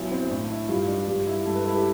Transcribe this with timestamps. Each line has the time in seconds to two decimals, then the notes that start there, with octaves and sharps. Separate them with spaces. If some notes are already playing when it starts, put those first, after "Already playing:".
Already playing: B1 E4
0.12 C4
0.30 A2 D4
0.50 E4
0.69 G2 F4
0.88 D4
1.07 G2 G4
1.27 E4
1.45 G2 A4
1.55 B4
1.65 E4 A4
1.75 G4